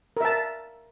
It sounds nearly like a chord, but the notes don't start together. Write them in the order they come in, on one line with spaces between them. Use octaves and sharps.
A#4 E5 A5